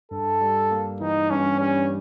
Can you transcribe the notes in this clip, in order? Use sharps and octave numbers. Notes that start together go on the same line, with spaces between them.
G2 A4
G3
A#3
E3 D#4
G2 C#4
G3 C#4